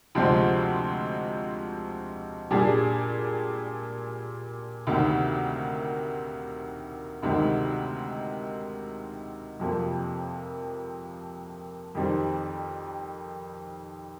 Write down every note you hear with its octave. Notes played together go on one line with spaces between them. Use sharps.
D2 C3 F3 G#3 C4
A#2 G3 D4 G#4
D2 C3 D#3 A#3
D2 C3 D#3 G#3
F2 C3 F3 A#3
F2 D#3 G3 C4